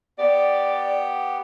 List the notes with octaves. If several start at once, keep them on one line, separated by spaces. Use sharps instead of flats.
B3 G4 D5